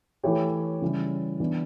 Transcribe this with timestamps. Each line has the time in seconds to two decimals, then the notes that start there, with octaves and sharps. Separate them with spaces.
0.23 E3 A3 E4 G4 C#5
0.82 C#3 E3 G3
1.40 E3 B3 D4